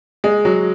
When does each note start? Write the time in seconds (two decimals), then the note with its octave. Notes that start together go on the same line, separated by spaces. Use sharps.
0.24 G#3
0.45 F#3